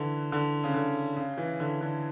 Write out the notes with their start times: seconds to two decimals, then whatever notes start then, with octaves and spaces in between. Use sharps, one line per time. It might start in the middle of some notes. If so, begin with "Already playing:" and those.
Already playing: D3 E3
0.32 D3
0.64 C#3
0.74 D3
1.16 C#3
1.38 E3
1.60 D3
1.81 D3